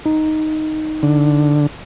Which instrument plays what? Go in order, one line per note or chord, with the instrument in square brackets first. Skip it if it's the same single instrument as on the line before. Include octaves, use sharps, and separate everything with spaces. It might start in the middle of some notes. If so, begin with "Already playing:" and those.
[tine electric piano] D#4
[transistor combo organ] D3